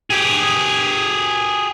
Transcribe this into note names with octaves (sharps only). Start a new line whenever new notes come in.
G4 G#4